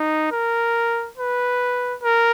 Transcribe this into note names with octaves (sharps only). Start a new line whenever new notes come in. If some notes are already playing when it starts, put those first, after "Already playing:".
Already playing: D#4
A#4
B4
A#4